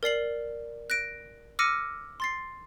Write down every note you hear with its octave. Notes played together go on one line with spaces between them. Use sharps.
A#4 D5 C7 F#7
F#6 A#6 D7
D6 E6 F6 A#6 C#7 D#7
C6 A6 C7